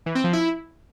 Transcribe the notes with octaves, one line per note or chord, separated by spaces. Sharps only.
E3
C4
F3
E4